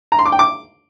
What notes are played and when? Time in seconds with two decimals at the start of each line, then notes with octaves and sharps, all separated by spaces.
0.12 A#5
0.19 C6
0.25 D6
0.32 G5
0.39 D6